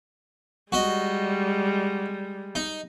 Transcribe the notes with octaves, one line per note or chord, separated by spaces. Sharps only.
G3 G#3 F#4 D#5
D#4